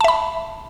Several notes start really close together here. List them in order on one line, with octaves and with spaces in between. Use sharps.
A5 E5 B5